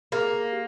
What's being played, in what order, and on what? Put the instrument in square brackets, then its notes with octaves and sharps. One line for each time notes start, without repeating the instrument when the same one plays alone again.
[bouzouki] A#3 [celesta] G#4
[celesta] G4